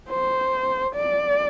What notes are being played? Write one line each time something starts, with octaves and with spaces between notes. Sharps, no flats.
C5
D5